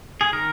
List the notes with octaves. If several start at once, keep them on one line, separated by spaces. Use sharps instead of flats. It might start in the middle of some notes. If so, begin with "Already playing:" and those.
G#4
D#3 A#4